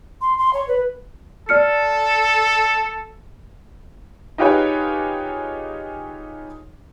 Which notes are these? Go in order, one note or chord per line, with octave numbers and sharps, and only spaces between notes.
C6
C6
C#5
B4
A4 D5 F6 C#7
D#4 F4 G4 G#4 B4 C#5